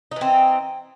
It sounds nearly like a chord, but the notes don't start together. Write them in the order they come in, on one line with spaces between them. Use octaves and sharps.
D#4 E3 C4